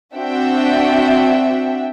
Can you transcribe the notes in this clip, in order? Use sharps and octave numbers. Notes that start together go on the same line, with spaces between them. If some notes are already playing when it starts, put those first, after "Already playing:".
C4 D4 F#4 E5 F#5 G5